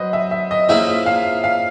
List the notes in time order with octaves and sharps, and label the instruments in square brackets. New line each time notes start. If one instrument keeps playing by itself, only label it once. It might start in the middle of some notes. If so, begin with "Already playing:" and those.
Already playing: [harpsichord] F#3 [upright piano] B4 C5 D#5
[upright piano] E5
E5
D#5
[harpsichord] F3 A#3 C#4 E4 G#4 [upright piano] E5
[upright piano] F5
F5